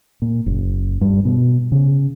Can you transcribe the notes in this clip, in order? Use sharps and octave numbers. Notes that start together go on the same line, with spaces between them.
A#2
F#1
G2
B2
C#3